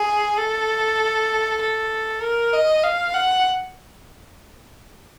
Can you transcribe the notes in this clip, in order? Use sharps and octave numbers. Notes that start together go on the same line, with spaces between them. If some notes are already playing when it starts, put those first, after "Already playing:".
Already playing: G#4
A4
A4
A#4
D#5
F5
F#5